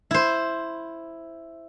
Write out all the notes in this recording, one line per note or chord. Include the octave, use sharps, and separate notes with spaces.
E4 C5